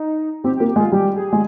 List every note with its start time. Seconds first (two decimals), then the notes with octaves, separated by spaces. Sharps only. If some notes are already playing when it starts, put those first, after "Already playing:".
Already playing: D#4
0.44 C4 G4
0.57 G4
0.60 A#3
0.68 G4
0.76 G#3
0.80 F4
0.92 G3 G4
1.16 G#4
1.33 G#3